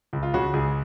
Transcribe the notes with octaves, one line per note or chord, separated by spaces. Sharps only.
C#2
F4
C#3 F#4
C#2 G#4